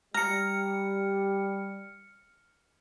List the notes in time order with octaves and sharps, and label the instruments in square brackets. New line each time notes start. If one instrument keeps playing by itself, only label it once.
[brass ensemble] G3 [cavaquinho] A#5 [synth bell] F6 C#7